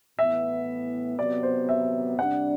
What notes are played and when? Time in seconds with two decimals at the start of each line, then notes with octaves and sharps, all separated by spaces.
0.18 A2 E3 B3 E5
1.18 C3 F#3 B3 D5
1.43 C5
1.69 E5
2.18 C3 G3 D4 F#5